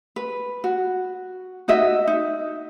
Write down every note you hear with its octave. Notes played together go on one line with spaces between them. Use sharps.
B4
F#4
D#4 F#4 D#5 E5
D#4